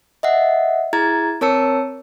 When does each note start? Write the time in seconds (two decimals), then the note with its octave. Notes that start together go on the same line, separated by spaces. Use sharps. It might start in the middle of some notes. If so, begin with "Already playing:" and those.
0.23 D#5 E5 F#5
0.93 E4 G#4 A#5 G#6 A6
1.41 C4 A#4 C#5 A5 E6 C#7